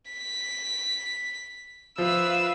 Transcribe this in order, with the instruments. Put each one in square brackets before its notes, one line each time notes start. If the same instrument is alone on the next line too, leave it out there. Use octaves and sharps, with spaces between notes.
[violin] B6
[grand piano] F3 [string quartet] B4 E5 F5 [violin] E6